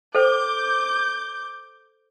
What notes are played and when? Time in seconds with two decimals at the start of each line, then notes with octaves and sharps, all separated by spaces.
0.15 A4 C5 D6 G6